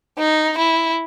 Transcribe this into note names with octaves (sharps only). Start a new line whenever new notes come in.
D#4
E4